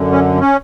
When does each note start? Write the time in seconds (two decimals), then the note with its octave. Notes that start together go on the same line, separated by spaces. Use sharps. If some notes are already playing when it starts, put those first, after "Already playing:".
Already playing: F#2 D3
0.12 C#4
0.40 C#4